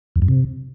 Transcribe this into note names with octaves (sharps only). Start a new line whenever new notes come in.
E2
F#2
C3